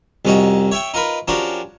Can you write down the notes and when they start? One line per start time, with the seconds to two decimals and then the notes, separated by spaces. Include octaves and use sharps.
0.25 C2 F2 C#4 D#4 F#4
0.71 C#5 E5 G5
0.94 D#4 F4 A#4 B4
1.28 F3 C#4 D4 F#4 G4 A#4